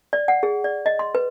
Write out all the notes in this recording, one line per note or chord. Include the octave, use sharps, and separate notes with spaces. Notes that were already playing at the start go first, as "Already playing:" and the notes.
D5
F#5
G#4
D5
D#5
C6
B4